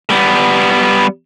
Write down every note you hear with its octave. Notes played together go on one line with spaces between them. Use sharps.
G3 B3